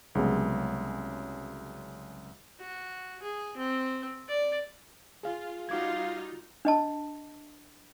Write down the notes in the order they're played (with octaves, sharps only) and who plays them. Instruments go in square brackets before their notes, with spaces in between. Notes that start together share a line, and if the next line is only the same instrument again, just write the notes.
[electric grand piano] C2 C#3 F#3 G#3 B3
[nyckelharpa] F#4
G#4
C4
D5
[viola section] F4 [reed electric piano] G#4 F5
[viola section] G3 D#4 F4 [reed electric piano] F#4 D6 G#6 [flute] F5
[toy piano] D4 D#5 A5